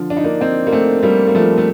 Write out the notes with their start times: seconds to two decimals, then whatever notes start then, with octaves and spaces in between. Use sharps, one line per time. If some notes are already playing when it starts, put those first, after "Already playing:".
Already playing: D3 F3
0.10 D4
0.17 D#4
0.24 A#3 D4
0.41 C4 D#4
0.67 A#3
0.72 A3 C4
1.03 G3 A#3
1.28 A#3
1.35 F3 A3
1.58 A3